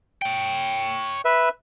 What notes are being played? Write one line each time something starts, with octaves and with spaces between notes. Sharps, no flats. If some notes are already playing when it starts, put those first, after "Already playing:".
C#5 G5
B4 E5